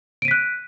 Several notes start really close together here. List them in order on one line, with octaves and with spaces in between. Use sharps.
D7 D#7 B6 F#6